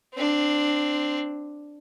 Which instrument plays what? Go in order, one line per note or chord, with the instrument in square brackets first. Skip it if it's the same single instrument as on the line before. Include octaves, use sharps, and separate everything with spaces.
[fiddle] C4 D4